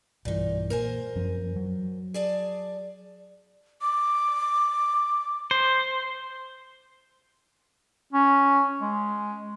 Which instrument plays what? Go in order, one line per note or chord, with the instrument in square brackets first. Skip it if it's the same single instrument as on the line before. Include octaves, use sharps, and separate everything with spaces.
[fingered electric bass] B1 G2 E3 [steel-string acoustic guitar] A#2 D#4
[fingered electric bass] A#2 [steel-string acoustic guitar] A#4 C5 G#5
[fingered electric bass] F#2 F3 C#4
F#3
[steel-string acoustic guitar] G#4 D5 A5
[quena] D6
[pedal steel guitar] C5
[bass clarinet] C#4
G#3